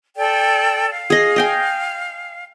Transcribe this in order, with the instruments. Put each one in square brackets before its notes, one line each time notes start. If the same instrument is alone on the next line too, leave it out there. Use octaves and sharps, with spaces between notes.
[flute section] A4 D5 G5
F5
[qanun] G#4 D#5
D#5 G5 G#5